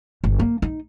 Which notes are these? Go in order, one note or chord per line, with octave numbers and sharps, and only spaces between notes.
G1
A#3
D#4